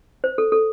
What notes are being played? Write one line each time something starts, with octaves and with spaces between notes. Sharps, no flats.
C5
A4
A4